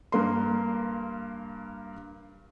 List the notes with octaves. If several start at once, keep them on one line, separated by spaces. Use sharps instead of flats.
G2 A#3 C6